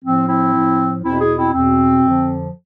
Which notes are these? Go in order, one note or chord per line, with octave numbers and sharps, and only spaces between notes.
A2 F3 C4
C4 E4
A2 F3
E2 B2 C4 E4
E4 G#4
C4 E4
E2 B2 C4
F2 D3 F3